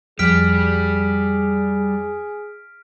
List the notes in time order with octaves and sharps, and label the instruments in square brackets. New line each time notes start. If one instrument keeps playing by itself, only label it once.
[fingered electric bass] F2 [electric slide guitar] G3 G4 [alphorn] G#4 [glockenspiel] F6 B6 D7